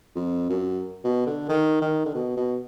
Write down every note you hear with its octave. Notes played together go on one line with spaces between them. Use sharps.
F2
F#2
B2
D3
D#3
D#3
D3
B2
B2